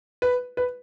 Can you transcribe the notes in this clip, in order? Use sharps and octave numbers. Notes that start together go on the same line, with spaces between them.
B4
B4